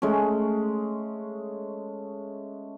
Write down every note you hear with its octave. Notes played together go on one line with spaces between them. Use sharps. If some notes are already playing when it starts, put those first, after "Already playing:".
G#3 A3 C#4